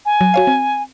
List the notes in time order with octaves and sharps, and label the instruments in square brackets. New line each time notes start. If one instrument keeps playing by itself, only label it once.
[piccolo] G#5
[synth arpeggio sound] F#3
F#4 C#5 F5
C4